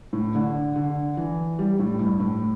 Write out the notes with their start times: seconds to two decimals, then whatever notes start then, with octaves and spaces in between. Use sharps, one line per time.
0.13 A2
0.35 D3
0.76 D3
1.17 E3
1.59 G3
1.79 A2
1.99 G2
2.20 A2